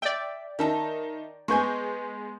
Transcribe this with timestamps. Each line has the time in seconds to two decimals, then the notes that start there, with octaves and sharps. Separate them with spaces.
0.02 D5 E5 G5
0.59 D#3 D#4 E5 A5 A#5
1.48 G#3 B3 G#5 C#6 G6